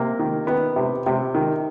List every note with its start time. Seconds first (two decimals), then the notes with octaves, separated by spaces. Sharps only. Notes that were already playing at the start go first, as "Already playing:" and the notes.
Already playing: C3 A#3
0.19 D#3
0.47 D#3 B3
0.76 C3
1.06 C3
1.35 D#3